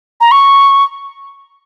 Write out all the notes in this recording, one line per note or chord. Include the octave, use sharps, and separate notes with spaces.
A#5
C#6